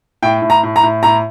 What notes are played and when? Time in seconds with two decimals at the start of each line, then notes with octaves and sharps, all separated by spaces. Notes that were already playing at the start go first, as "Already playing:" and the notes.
0.22 A2 G5
0.42 A2
0.50 A#5
0.63 A2
0.76 A#5
0.83 A2
1.03 A2 A#5